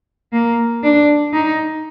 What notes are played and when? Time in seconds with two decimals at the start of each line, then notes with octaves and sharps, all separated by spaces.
0.33 A#3
0.83 D4
1.33 D#4